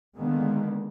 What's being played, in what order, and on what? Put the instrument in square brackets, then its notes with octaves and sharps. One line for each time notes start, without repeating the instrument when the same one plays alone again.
[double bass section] D3 D#3 G#3 A#3 B3